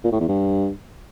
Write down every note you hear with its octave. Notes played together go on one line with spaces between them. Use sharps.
A#2
A2
E2
G2